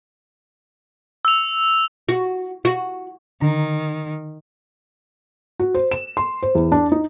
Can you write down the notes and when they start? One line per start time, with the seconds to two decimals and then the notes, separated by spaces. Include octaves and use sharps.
1.25 E6 F7
2.09 F#4
2.65 F#4
3.41 D3 D#3 A#5
5.59 F#4
5.75 C5
5.91 E7
6.17 C6
6.43 C5
6.55 E2
6.72 D4
6.92 D#4